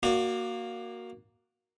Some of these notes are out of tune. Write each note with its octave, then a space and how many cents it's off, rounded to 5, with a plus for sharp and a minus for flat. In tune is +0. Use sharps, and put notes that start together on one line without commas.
A#3 +0 F#4 +0 D5 +35